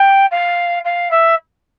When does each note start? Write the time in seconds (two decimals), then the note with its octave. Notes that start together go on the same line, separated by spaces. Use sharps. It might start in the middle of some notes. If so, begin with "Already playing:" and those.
Already playing: G5
0.31 F5
0.85 F5
1.11 E5